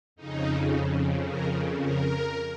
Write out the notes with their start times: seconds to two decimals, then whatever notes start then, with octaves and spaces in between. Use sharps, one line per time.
0.16 F2 C#3 D#4
1.27 A#4
1.83 A#4